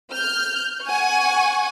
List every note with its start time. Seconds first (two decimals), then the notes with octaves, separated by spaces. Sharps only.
0.10 F6 G6
0.85 F#5 G#5 C#6